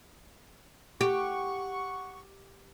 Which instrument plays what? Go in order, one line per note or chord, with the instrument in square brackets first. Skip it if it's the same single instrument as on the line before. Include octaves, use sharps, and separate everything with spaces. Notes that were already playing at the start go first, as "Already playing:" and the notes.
[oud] G4 [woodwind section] F#5 C#6